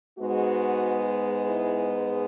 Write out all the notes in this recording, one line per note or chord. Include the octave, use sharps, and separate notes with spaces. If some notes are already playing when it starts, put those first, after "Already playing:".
G#2 G#3 B3 F#4
E4 G#4